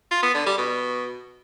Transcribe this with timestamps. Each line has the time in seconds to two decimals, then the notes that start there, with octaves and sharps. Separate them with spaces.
0.11 F4
0.23 B3
0.35 D3
0.46 G3
0.58 B2